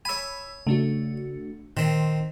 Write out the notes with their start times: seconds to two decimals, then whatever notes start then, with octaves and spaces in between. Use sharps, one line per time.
0.05 C#5 G#5 B5 E6
0.67 C#3 A3 D4 F#4
1.77 A#2 D#3 C4 C6